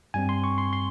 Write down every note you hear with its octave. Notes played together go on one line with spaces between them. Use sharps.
G2 G3 C4 G#5
C6
C#6
C6
C6